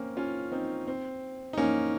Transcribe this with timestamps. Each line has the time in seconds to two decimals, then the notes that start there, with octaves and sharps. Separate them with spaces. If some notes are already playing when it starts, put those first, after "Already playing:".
Already playing: A#3 C4 C#4
0.17 C#4 F4
0.52 C4 D#4
0.87 C4
1.53 D#4
1.58 A#3 C#4